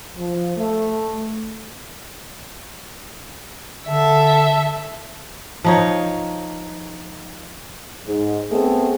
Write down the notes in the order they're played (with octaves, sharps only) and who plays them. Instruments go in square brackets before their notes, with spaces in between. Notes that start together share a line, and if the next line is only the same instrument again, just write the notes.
[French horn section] F3
A3
[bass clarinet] D3 [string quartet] A4 E5
[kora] F3 D#4 C#5
[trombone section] G#2
A3 B3 C4 G#4